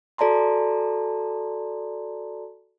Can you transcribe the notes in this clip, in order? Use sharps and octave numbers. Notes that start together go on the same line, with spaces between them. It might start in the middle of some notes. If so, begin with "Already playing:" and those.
F#4 A4 D5 A5 A#5 C6